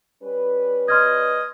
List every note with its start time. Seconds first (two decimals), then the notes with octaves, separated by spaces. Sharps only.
0.23 G3 C#4 B4
0.88 D#5 C6 F6 G#6